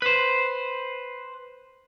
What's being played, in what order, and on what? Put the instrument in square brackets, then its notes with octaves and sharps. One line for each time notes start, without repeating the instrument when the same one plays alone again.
[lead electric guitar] B4 C5